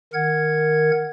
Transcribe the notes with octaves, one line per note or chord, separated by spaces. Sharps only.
D#3 A#4 F#5 G#6